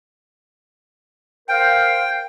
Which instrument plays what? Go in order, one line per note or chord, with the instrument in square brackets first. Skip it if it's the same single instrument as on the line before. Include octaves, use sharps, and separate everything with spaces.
[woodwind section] A#4 C5 F5 [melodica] G5